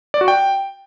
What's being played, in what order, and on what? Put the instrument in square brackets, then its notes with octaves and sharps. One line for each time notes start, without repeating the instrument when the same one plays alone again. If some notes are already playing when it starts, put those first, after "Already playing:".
[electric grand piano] D5
F#4
G5